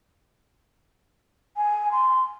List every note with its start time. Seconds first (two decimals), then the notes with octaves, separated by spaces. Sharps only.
1.57 G#5
1.92 C6